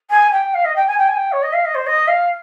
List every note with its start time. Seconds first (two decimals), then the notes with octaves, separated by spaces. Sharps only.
0.11 G#5
0.32 G5
0.54 F5
0.65 D#5
0.76 G5
0.87 G#5
0.98 G5
1.08 G#5
1.16 G5
1.32 C#5
1.43 D#5
1.53 F5
1.65 D#5
1.75 C5
1.87 D#5
2.08 F5